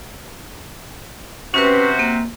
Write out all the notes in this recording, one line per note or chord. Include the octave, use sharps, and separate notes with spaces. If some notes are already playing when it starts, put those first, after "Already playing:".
C3 C#4 F#4 B4 C5
A#3